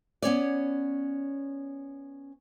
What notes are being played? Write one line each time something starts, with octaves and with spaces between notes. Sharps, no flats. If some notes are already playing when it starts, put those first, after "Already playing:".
B3 C#4 C#5 D5